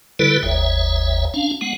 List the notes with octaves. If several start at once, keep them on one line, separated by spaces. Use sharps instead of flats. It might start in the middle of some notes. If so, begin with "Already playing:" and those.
D3 G3 E4 A4 B4
G1 D#2 C#5 E5
C#4 D4 F5
G#3 B3 F#5